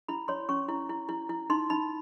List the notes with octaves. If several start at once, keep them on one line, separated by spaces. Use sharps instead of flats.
E4 B5
C#5 C6
C#4 C#6
E4
E4
E4
E4
D#4 C6
D#4 B5